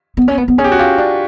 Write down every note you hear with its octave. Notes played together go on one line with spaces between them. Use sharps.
B3
C#4
B3
B3
C#4 G#4
G4
F#4
F4 G4
D4